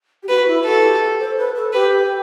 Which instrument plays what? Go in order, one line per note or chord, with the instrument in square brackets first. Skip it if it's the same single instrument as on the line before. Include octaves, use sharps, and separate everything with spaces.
[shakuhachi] G4
[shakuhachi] F#4 [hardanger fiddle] B4
[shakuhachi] F#4
E4
[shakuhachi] F#4 [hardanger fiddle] A4
[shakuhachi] G4
A4
C5
B4
A4
[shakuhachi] G4 [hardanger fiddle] B4